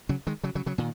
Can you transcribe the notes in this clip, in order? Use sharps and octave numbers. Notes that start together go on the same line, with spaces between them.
C#3 F#3
D#3 G#3
C#3 F#3
C#3 F#3
C#3 F#3
A#2 D#3